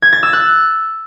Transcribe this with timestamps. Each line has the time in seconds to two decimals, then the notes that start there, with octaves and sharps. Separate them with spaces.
0.02 G#6
0.13 A6
0.23 E6
0.33 F#6